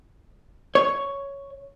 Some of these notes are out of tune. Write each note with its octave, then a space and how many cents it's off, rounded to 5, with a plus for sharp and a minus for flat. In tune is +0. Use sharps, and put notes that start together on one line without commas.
C#5 +5